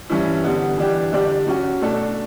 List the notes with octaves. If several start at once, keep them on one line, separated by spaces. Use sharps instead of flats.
G2 E3 G3 C#4 E4
D3 G3 B3
E3 G3 D4 G4
D3 G3 D4 G4 D5
F#3 C#4 F#4
B2 A3 D4 A4